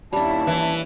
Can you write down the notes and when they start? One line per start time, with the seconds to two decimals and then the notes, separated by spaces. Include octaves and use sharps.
0.13 D#2 G3 C#4 D4 E4 A5
0.47 E3